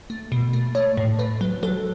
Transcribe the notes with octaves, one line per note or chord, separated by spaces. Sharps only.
A3
B2
A3
A3 C#5
A2
A3 B4
F#3
F#3 A4